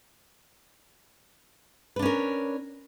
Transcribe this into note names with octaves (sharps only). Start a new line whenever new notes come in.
C#4 D4 A#4 B4